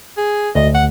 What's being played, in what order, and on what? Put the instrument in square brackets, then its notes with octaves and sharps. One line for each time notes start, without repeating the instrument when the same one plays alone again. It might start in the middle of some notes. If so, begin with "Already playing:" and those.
[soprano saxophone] G#4
[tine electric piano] D2 [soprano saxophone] D#5
[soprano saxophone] F#5